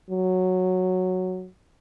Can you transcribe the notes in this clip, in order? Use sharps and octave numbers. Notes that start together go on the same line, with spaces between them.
F#3